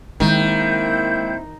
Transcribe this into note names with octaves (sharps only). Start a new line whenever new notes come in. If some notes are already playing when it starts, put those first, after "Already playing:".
D#3 G#3 A#3 C4 E4 G6